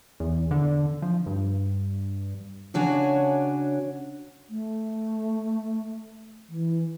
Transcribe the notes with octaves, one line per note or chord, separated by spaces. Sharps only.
E2
D3
F3
G2
C#3 D4 F#4 C#5 G#5
A3
E3